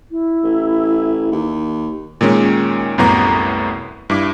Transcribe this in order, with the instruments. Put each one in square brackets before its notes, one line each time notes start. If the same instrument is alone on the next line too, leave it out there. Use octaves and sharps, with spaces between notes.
[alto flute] E4
[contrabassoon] A1
D#2
[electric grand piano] A#2 D#3 G#3 C#4
C2 F#2 A2 B3 A#5 D6
G2 E4 D6